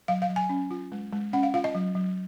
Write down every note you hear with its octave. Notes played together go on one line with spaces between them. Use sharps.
F#3 F5
F5
F#3
G#5
C#4
F4
G#3
G#3
C#4 F#5
F5
F4 F5
D#5
F#3
F#3